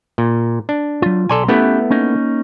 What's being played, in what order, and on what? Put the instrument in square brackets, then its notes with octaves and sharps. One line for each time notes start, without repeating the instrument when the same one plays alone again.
[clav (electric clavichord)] A#2
D4
[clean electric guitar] F#3 F4
[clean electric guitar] B1 A#5 C6 [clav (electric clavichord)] A4 D5 G#5
[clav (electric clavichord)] A3 B3 E4 [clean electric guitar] C#4 G4 B4
[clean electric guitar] A#3 C#4 D#4